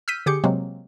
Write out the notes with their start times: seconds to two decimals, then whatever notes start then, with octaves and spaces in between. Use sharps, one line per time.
0.08 E6 F6 G6 B6 D#7
0.26 D3 G4 G#4 D6 G6 C#7
0.44 C3 F#3 G#3 A#3 C4